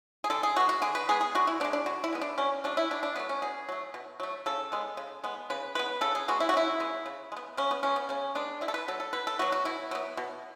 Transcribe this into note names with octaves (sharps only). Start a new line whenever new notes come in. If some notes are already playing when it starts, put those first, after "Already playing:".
G#4
D3 A4
G#4
G#3 B3 F#4
F#4
D3 G#4
B4
G#3 B3 G#4
G#4
D3 F#4
E4
B3 D4
G#3
D4
D3 F#4
E4
G#3 B3
D4
B2 C#4
F#3 A3 D4
E4
B2 D4
D4
F#3 A3 B3
C#4
B2 G#4
F#3 A3
B2
F#3 A3
C#3 A4
G#3 B3
C#3
G#3 B3
C#3 B4
G#3 B3 B4
C#3 A4
G#4
G#3 B3 F#4
E4
F#4
C#3 E4
G#3 B3
C#3
G#3
B3
C#3 C#4
B3
G#3 B3 C#4
B3
C#3 C#4
G#3 B3 D4
B2 E4
A4
B4
F#3 B3 A4
A4
B2 B4
A4
F#3 B3 F#4
F#4
B2 E4
F#3 B3
B2